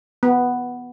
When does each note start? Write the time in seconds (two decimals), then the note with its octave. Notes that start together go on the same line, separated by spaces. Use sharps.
0.23 B3